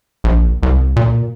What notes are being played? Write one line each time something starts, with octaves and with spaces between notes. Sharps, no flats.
A#1
C2
A#2